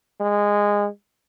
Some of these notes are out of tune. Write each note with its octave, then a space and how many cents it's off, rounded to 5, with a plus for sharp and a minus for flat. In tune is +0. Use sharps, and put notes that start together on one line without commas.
G#3 -15